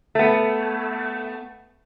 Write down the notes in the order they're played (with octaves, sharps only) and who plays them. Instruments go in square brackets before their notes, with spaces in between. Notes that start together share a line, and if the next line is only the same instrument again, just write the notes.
[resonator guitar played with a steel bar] A3 B3